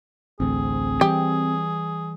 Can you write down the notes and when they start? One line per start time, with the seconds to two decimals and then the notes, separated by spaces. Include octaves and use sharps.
0.40 A1 D2 C4 G#4
1.01 E3 G3 G4